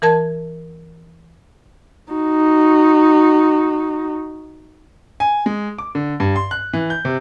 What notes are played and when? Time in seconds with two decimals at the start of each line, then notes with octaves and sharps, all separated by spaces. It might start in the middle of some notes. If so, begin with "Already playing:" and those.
0.02 E3 A#4 A5 G#6
2.13 D#4 F#4
5.20 G#5
5.46 G#3
5.78 D6
5.95 D3
6.20 G2
6.36 C6
6.51 F#6
6.73 E3
6.90 G6
7.05 C3